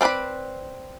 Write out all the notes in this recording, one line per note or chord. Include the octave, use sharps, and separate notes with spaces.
C4 A4 B4 D5 B5